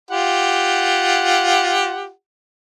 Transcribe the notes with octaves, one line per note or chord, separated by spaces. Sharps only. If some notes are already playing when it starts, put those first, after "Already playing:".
F4 G4 F#5